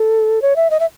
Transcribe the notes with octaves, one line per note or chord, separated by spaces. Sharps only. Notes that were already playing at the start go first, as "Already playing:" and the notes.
Already playing: A4
C#5
E5
D#5
E5